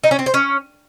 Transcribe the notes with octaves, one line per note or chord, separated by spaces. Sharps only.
D#4
C#4
C4
C5
C#4